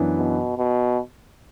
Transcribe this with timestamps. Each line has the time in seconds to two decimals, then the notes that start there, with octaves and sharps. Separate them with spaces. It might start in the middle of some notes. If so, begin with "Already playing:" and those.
Already playing: F#2 E3 B3 D4
0.18 B2
0.58 B2